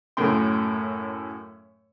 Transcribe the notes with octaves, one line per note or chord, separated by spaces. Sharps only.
F#2 A2 C#3 G5 C6